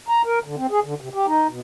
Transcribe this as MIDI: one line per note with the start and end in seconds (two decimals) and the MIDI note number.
0.08 0.22 82
0.25 0.39 70
0.44 0.55 50
0.57 0.66 60
0.71 0.80 68
0.84 0.94 50
1.01 1.09 48
1.14 1.26 67
1.27 1.47 63
1.49 1.60 47